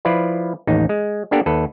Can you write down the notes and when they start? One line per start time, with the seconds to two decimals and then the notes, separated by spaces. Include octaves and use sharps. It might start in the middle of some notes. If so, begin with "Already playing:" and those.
0.05 F3 E4 F4 B4 D5
0.67 A1 D#2 D#4
0.89 G#3
1.31 A#3 B3 D4 G4 A4 A#4
1.46 D#2 A4 B4